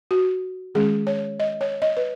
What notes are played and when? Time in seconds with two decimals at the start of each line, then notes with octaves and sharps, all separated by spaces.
0.11 F#4
0.75 D#3 G#3 C#4 G#4
1.07 C#5
1.40 D#5
1.61 C#5
1.82 D#5
1.97 B4